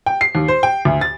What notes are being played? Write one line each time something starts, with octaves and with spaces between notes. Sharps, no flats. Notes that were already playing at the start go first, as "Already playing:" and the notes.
G5
C7
D#2
C5
G5
D2
A6